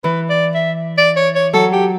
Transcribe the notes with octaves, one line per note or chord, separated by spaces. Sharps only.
E3 B4
D5
E5
D5
C#5
C#5
F#3 A4
G4